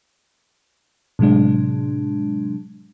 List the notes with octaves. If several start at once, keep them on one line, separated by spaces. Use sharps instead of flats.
A2 C3 F#3 G#3 D4